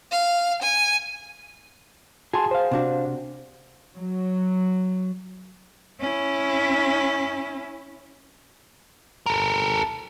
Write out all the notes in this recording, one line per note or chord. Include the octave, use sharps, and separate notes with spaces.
F5
G#5
F#4 G#4 G#5 A5 C6
C5 F5
C3 D4 F#4
F#3
C#4 E4
A4 A#4